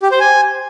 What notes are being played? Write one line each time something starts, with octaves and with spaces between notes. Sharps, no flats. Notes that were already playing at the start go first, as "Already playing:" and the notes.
G4
C5
G#5